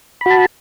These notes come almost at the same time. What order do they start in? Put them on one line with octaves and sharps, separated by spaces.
B5 F#4 A5